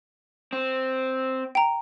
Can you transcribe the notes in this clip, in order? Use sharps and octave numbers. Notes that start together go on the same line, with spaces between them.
C4
G5 A#5